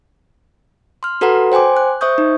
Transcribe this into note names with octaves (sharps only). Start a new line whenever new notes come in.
C6 F6
F#4 A4 B4 F#5 A#5 C6
C5 G5 G#5 C6 D6
F#6
C5 E5 C#6 D#6 G6
D#4